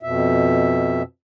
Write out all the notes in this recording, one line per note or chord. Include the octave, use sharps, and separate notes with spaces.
F2 B2 E5